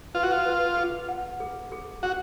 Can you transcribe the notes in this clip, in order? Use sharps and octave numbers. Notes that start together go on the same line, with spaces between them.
F4 B4
F#4
F4
B4
G#4
F#5
G#4
G#4
F#4 F#5